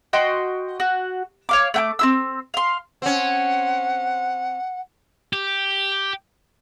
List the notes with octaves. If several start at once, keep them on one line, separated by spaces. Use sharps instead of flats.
F#4 D#5 G5 C6
F#4
C#5 F5 D6
A3 G5 D6
C4 E4 E6
F5 C6
C4 C#4 F#5
G4